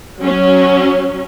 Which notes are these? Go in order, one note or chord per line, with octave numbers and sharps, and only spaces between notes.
F#3 C#4